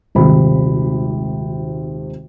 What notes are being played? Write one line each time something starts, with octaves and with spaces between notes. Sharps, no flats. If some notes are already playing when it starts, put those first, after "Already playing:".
D#1 G#1 C3 B5